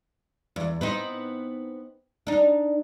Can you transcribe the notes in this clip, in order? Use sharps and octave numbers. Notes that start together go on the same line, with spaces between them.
E2
B3 C4 D#4
D4 D#4